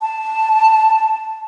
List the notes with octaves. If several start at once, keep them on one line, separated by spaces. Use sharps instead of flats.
A5